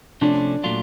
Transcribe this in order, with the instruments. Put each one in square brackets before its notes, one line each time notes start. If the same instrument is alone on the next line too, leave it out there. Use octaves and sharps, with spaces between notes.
[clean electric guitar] C3 F3 A3 C#4 [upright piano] D4
[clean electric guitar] A#2 F#3 A3 D4 F4